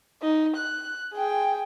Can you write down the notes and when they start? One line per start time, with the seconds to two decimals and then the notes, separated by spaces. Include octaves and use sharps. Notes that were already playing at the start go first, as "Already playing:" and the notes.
0.22 D#4
0.57 F#6
1.14 G#4 G5